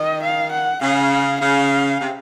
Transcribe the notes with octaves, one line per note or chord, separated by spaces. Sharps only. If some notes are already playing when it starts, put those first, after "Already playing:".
Already playing: D#3 D#5
F5
F#5
C#3 F5
C#3 F5
C3